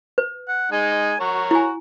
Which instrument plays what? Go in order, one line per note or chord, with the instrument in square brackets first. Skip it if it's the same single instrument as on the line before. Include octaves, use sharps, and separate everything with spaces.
[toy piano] B4
[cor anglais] F#5
[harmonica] G#3 D#4 [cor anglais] G#5
[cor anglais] F#4 [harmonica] A#4 C#5 A#5
[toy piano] E4 G#5 [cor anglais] F#4